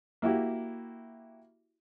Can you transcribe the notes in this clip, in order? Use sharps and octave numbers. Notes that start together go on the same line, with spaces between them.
A#3 E4 F#4 G4